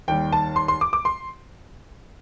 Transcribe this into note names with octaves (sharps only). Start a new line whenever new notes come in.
D#2 D#3 G3 G5
A5
C6
C6
D6
D6
C6